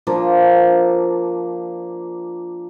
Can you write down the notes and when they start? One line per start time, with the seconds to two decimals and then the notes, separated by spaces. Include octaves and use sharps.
0.07 F3 A#3 D4